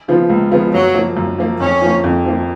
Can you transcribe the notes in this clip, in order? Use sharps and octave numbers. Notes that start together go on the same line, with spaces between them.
C#3 F3 B3 F4
C#2
C#3 F3 B3 F4
F#2 F#3
F3 A#3
F#2
F3 A#3
F2 C#4
F3 A#3
F2
F3 A#3